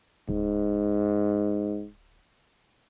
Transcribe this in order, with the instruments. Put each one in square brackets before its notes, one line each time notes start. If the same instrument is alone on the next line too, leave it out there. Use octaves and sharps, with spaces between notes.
[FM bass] D1 [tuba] G#2